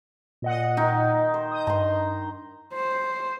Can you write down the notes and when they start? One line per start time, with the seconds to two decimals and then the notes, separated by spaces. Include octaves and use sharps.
0.42 A#2 D#5 F#5
0.77 D#3 D#4 A#4
1.34 C5
1.52 D#6 G6
1.67 G2 A#5 C6
2.74 C5